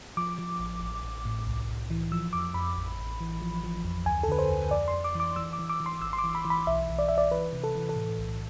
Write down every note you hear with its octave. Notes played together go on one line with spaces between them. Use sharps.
F3 D6
F3
A1
A1
A1
A2
C2
C2
E3
F3 E6
F2 D6
F2 B5
A1
A1
E3
F3
F3
F2
D2 G#5
A4
D3 B4
C5
D2
F2 D5
C6
F2
D6
E3 D6
E3 E6
D6
E3
D6
E3
C6
G#1 E6
C6
D6
E3
B5
E3
B5
B1 E5
B1
D5
B1 E5
D5
E3 B4
C3
A4
E3
A4
A2
B1